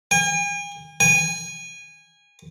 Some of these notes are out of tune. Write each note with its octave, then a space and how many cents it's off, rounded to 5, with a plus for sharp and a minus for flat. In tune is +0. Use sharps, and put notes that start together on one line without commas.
G#5 -40
G#5 -20